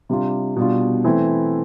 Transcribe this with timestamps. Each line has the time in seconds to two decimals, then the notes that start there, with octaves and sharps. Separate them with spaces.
0.09 C3 G3 D4 F4
0.56 B2 G3 D4 F4
1.04 E3 A3 C4 E4